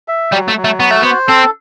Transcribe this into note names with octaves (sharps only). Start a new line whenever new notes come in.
E5
F#3 G3
A3
F#3
A3
B3 F#4
A3
B3
C5
C4 A4